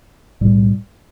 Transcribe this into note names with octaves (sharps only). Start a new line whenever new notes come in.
B1 A2 G3